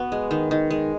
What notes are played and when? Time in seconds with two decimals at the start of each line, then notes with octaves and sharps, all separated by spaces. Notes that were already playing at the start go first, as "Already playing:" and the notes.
Already playing: B3 F#4
0.12 G#3
0.31 D#3
0.51 D#3
0.71 G#3